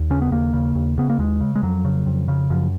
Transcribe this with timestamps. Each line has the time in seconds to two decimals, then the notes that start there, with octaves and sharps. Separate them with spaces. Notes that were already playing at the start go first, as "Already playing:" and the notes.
Already playing: D#2
0.10 C#3 C#4
0.21 B3
0.32 D#2 A#3
0.53 C#3
0.75 D#2
0.98 C#3 B3
1.10 A#3
1.19 D#2 G#3
1.41 C#3
1.56 G#3
1.63 F2 F#3
1.85 C#3
2.06 F2
2.28 C#3
2.50 F#2 F3